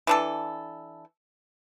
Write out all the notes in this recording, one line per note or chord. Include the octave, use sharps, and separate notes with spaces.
E3 D4 A4